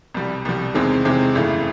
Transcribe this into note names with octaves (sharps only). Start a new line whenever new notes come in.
C2 B2 G3
C2 B2 G3
E2 C3 D#3 G#3 C4
E2 C3 D#3 G#3 C4
G1 F2 C#3 E3 A3